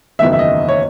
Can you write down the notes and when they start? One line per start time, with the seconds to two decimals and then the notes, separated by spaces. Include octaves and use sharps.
0.19 F#1 E2 D#3 E5
0.33 E5
0.39 D#5
0.68 C#5